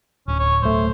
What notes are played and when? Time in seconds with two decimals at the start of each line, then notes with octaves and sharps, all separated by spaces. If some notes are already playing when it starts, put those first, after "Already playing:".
0.28 D1 C#4
0.40 C#5
0.62 B1 A3 C5